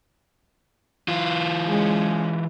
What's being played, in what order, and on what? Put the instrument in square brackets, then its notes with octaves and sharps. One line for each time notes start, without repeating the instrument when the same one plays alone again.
[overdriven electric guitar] E3 F4
[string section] G#3 C#4